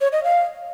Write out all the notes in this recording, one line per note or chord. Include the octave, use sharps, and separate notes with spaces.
C#5
D#5
F5